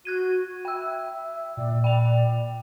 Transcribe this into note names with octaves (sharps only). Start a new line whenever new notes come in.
F#4 F#6 G#6 D#7
E5 G5 E6
A#2 D5
D5 G5 F7